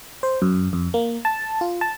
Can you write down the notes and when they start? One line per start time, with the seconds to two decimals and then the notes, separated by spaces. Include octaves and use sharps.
0.23 C5
0.42 F#2
0.73 F2
0.94 A#3
1.25 A5
1.61 F4
1.81 A5